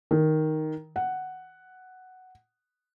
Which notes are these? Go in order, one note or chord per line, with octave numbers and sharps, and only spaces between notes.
D#3
F#5